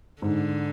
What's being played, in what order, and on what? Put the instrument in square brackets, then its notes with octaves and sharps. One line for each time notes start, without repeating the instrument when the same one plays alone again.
[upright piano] G#2 [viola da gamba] D3